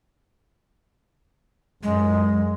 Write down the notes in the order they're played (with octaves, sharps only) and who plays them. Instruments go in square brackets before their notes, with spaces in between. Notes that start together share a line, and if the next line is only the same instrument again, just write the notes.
[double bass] F#2 [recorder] G#3